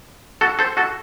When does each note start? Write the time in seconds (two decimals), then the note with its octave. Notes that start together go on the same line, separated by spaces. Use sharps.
0.41 F#4 A4
0.59 A4 C5
0.77 F#4 A4